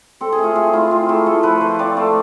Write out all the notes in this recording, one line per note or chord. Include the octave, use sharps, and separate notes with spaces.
C4 A4
G#4
A3
F4
A3 G#4
E4 F4
C4 F4
A3 G#4
A3 A4
F3 B4
F3 C5
C4 D5
A3